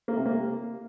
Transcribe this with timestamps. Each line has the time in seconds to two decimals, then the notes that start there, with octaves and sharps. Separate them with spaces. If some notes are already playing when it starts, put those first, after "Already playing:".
0.08 A#3
0.17 C3
0.26 A#3